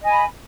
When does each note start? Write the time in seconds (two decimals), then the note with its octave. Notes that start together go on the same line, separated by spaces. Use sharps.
0.01 D#5
0.05 G#5
0.10 B5